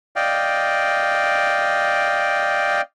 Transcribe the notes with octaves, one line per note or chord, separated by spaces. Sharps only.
D5 D#5 F5 G5